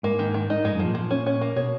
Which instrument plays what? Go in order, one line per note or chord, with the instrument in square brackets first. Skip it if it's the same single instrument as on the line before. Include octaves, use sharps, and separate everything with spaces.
[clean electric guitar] G#2 [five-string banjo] A#3
[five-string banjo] D#3
D#3
D#4
[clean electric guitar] G#2 [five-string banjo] G#3
[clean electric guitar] F#2
[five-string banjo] F3
[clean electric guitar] A#2
[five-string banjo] F3
C#4
C#4
A#3
[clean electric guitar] B2 [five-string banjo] C#5